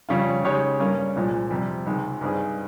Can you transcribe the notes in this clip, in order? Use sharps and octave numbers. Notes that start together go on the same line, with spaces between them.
F2 C#3 G3 C#4 F4
C#3 G#3 D#4 G4 C#5
G2 G3 A#3 C#4
C2 A#2 F3 G#3
F2 C3 G3 C4
C#2 C3 D#3 G#3
G2 G3 C4 D#4 G#4